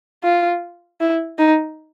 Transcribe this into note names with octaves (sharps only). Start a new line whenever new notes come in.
F4
E4
D#4